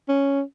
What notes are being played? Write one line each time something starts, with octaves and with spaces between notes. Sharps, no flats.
C#4